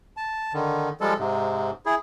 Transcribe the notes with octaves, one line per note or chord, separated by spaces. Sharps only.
A5
D3 D#3
F3 G3 G#3 A4
G#2 C3
E4 G#4